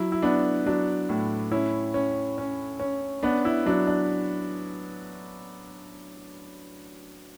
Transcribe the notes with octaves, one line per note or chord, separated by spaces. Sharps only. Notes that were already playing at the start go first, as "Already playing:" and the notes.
Already playing: F#3 E4
E4
B3 D4
F#3 D4
A2
C#4 E4
C#4
C#4
C#4
B3 D4
E4
F#3 D4
D4